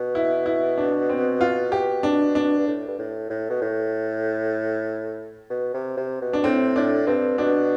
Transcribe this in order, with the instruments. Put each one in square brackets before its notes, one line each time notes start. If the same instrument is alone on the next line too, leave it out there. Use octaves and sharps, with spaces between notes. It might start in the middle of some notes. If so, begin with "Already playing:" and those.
Already playing: [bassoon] B2
[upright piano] E4
E4
D4
C4
F4
[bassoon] B2 [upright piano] G4
[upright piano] D4
D4
[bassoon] G2
A2
G2
A2
A2
B2
A2
B2
C3
C3
B2
[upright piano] D4
[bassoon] A2 [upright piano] C4
[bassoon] A2 [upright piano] D4
[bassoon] G2 [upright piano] C4
[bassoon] B2 [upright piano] D4